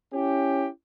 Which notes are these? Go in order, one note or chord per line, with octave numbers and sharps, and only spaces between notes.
C#4 E4 G4